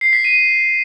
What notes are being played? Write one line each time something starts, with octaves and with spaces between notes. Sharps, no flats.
C7
B6
D#7